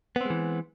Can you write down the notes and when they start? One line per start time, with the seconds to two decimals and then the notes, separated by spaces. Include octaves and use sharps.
0.16 B3
0.21 C4
0.26 G#3
0.30 E3